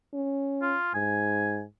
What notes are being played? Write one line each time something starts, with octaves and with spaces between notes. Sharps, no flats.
C#4
F4
G#2 G#5